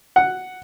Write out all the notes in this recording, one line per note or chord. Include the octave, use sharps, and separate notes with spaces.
F#5